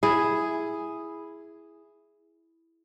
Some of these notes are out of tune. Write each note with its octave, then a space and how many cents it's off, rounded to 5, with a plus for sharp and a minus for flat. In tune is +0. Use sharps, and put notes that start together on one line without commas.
E4 +0 G#4 +0